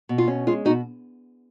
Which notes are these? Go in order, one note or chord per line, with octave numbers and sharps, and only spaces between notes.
B2
F4
C#4
G#3 F4
B2 D#4 F#4